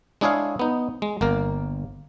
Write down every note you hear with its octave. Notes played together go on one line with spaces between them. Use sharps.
G#3 D4 E4 G#4 C#5 F5
B3 D#4
G#3
G1 A#3 A#4